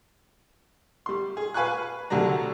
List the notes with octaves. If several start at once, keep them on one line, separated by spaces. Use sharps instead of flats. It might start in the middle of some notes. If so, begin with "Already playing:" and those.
G3 C6
G#4
B4 F5 G#5 B5 C#6 F#6
C2 D3 F#3 G3 D4 A#5